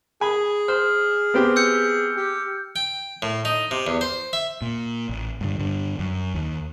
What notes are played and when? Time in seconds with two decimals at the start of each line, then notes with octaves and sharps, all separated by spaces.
0.21 G#4 G#5 B5
0.68 C5 F6
1.34 B3 C4 G4
1.56 E6 G6 C#7
2.17 G4
2.76 G5
3.22 A2
3.45 D#4
3.71 C3
3.87 E2
4.01 C5
4.33 E5
4.62 A#2
5.09 A1
5.41 G2 A#2 D3
5.59 G2 D3
5.99 F#2
6.34 D#2